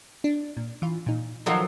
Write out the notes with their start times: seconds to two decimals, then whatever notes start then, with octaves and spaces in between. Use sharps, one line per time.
0.24 D4
0.57 A#2
0.82 E3 F4
1.06 A#2 D#4
1.46 D#3 F3 F#3 A4 D#5